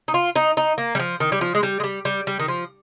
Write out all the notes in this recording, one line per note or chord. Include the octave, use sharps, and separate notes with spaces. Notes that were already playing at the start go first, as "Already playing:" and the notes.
D#4
F4
D#4
D#4
A#3
G3
F3
D#3
G3
F3
G#3
G3
G#3
G3
G3
G3
D#3
F3